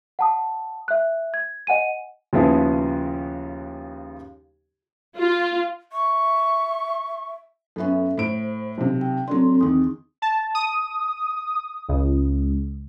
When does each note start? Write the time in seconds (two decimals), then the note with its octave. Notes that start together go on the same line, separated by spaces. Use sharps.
0.19 F#5 A5 D#6
0.88 E5 F#6
1.34 G#6
1.67 D#5 F#5 G#5 D#7
2.33 D#2 C#3 F3 B3 E4 G#4
5.17 F4
5.92 E5 C#6
7.76 F#2 B3 C#4 A4 E5
8.18 A2 C5 D7
8.78 B1 C3
9.01 G5
9.28 F#3 C4 D4 A4 C6
9.61 E2 D#3 C4 D#6
10.22 A5
10.55 D#6
11.88 C#2